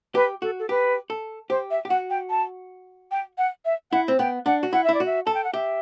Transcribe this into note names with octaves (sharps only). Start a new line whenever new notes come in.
G4 B4
F#4 A4
A4
G4 B4
A4
G4 C5
E5
G4
F#4 F#5
G5
A5
G5
F#5
E5
E4 F#5
C4
B3 G5
D4 F#5
F#4
E4 F#5
E4 E5
D5
F#4
E5
A4 A5
G5
F#5
G4 E5